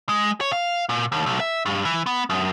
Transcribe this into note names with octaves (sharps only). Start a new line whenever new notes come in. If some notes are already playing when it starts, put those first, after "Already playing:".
G#3
C#5
F5
A#2
D#2
B1
E5
G2
E3
B3
F#2